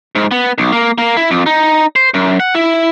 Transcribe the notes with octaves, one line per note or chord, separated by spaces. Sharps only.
G#2
B3
B1
A#3
A#3
E4
F2
D#4
C5
F#2
F#5
E4